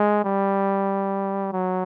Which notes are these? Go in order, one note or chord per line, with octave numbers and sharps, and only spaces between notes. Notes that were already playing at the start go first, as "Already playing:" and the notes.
Already playing: G#3
G3
F#3